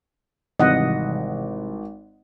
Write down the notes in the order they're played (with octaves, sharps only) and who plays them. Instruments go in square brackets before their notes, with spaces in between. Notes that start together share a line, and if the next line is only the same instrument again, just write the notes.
[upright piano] G#1 [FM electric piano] C3 E3 G3 [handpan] D#5 F#5